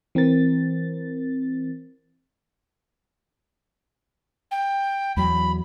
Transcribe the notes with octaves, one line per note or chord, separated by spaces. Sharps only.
E3 C4 A#4 A6
G5
E2 F#3 B5